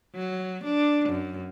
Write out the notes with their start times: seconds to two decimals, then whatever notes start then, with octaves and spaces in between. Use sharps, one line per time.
0.15 F#3
0.64 D4
1.09 F#2